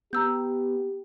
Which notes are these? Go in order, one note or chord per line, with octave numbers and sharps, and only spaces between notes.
B3 G4 A#5 E6 G6